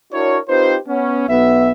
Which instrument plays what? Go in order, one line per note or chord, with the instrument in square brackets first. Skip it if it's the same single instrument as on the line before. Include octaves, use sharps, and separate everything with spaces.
[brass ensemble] D4 E4 F#4 A#4 C#5
C4 D#4 F4 G4 B4 C5
B3 C#4
B1 B3 E5